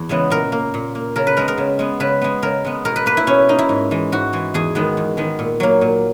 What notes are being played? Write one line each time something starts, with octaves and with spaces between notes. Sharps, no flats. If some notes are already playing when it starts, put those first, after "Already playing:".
Already playing: E2
C#3 E3 G#3 B3
A#2 A#4
A#3
A#2
A#3
C#3 A#4
B4
G#3 B3 A#4
A#4
C#3
G#3 B3
C#3 B4
G#3 B3
C#3 A#4
G#3 B3
B2 A#4
B4
A#3 B4
E4
B2 C#4
A#3 D#4
E4
G#2
E3 G#3
G#2 F#4
E3 G#3
E2 G#4
D#3 G#3 B3
E2
D#3 G#3 B3
A#2
F#3 A#3
A#2